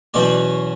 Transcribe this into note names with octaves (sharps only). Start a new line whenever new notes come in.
E2 B2 F#3 C#4 D5